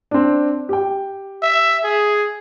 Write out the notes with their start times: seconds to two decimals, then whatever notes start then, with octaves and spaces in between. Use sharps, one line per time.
0.11 C4 D4
0.69 G4 G5
1.43 E5
1.84 G#4